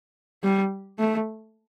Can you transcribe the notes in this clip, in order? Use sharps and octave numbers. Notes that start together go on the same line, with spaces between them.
G3
A3